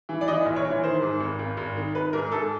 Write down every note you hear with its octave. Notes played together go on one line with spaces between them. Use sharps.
E3
D5
E3 D#5
A#1
C#5
E3
D#3 C5
G#2
G#1
G#1
G#1
D#3
D#3 B4
G#2 A#4
G#2 A4